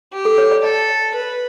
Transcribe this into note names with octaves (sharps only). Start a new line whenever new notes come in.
G4
A4
C#5
D5
A4 D5
B4